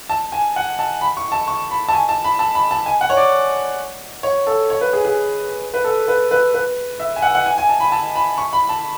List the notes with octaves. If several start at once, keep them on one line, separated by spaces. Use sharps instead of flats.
A5
G#5
F#5
A5
B5
C#6
A5
C#6
B5
A5
G#5
A5
B5
A5
B5
A5
G#5
F#5
C#5
D5
C#5
A4
C#5
B4
G#4
G#4
B4
A4
B4
B4
B4
E5
G#5
F#5
F#5
G#5
G#5
A5
B5
A5
B5
C#6
B5
A5